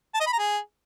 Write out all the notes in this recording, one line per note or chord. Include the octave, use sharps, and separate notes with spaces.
A5
D#5
B5
A#5
G#4